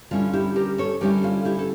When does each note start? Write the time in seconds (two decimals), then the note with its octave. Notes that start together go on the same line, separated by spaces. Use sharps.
0.11 D3 G3 C#4 E4 F4
0.33 E4 G4
0.56 G4 A#4
0.78 A4 C#5
1.01 D3 G3 C#4 E4 G4 A#4
1.23 F4 A4
1.45 E4 G4
1.59 A4